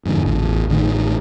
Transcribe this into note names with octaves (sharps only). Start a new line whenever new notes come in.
F2 G#2 B2 D3
A1 E2
A1 A2 D3 D#3